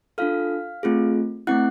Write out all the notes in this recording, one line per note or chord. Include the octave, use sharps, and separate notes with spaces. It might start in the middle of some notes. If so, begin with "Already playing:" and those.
D4 F4 A4 F5 F6
A3 C4 F4 G#4
A3 C4 E4 F#5 F#6